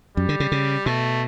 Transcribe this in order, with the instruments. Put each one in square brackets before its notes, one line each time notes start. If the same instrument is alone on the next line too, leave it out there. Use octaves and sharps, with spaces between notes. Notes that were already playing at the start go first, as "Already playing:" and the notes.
[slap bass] F#2 [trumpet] G3
[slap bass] D3
C#3
C#3
[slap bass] B2 [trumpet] A3